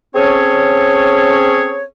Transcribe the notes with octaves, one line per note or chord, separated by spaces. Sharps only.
C4 C#4 G#4 A4 C#5